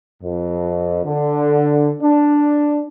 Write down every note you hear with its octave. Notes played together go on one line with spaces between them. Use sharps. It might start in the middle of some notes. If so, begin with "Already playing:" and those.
F2
D3
D4